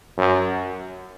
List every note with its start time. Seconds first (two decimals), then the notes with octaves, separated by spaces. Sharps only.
0.18 F#2